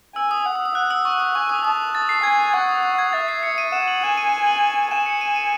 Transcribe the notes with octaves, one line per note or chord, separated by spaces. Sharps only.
G#5 E6
D#6
F#5
D#6
D#6
F#5 F#6
E6
C#6
D#6
G#5 C#6
D#6
A5 D#6
A6
C7
G#5 G#6
F#5 C#6
D#6
C#6
G#6
E5 A6
C7
C#7
D#7
F#5 E7
F#7
G#5 E7
D#7
E7
F#7
G#5 E7
C#7
D#7
D#7